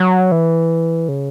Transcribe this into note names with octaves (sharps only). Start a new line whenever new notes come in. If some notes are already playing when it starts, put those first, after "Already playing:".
Already playing: F#3
E3
C#3